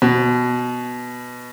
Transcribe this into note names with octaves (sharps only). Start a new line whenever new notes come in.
B2